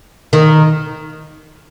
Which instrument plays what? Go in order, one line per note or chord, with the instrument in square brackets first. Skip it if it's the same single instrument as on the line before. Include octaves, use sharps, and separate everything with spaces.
[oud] D#3